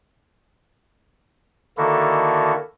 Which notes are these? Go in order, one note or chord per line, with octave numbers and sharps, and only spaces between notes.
D3 D#3 A#3 E4 F#4 A4